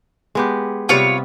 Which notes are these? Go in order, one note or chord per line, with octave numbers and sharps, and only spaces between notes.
G#3 B3 G4
C3 G3 B3 F4 C#5